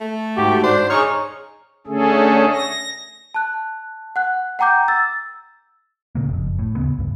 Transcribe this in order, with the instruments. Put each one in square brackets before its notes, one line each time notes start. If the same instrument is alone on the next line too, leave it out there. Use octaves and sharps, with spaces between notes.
[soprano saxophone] A3
[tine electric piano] G#2 F#4 [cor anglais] G4
[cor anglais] D4 [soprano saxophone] C5
[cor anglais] D#4 [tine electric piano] G#4 C#6 F6 [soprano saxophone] C#5
[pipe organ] D3 A3 C#4 G#4 A4
A#6
[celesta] A5 F#6
F#5 F#6
F#5 G5 A#5 D6 G6
E6 A6
[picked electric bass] A#2 C#3 A#3
F#1 F2
A2
D#2 C#3 B3
C#2 G2